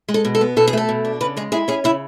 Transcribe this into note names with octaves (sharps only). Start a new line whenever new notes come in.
G#3
A4
B2
A4
B3
B2 A4
G#4
A3 A4
B2
D4
C#3 B4
G#3 G#4
E4 G#4
C#4 G#4
C#3 E4